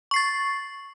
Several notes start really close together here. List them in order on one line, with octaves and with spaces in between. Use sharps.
C#6 C7 A6